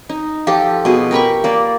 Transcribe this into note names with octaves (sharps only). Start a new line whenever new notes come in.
D#4
F3 F4 G4 A4
B2 G#4
G4 A#4 B5 C#6
A#3 D5